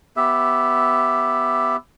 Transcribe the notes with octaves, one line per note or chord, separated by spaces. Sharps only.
B3 G4 E5